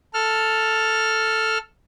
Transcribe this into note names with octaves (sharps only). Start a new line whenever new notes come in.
A4 F6